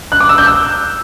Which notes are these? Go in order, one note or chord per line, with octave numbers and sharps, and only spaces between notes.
F#6
D6
E6
G6
E6